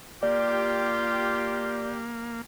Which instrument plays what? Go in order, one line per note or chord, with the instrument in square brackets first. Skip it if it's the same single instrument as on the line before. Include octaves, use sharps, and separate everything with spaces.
[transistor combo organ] A#3 [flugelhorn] F4 [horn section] G4 [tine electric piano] D5